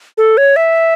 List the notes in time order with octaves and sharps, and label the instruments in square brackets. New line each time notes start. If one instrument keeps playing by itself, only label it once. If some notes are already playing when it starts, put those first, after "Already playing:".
[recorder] A4
C#5
E5